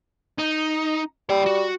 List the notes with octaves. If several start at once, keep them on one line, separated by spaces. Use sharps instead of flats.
D#4
G3 C#5 G5
F#4